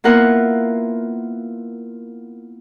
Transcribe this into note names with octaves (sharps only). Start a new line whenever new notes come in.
A#3 B3 E4 F4 A#4 F#5